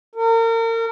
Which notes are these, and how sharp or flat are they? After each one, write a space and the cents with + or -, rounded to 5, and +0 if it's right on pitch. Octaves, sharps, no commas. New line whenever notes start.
A#4 -35